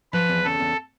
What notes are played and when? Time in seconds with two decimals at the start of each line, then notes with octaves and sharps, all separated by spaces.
0.13 F3 B4
0.29 E2
0.44 C#3 A4
0.60 E2